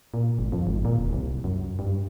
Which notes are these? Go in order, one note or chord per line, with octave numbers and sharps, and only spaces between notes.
A#2
G#1
F2
G#1
A#2
D#1
C2
F#2
G2